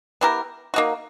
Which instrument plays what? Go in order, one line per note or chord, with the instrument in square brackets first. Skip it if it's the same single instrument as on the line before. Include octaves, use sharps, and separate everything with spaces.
[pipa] B3 E4 G4 A#4
A#3 D#4 F#4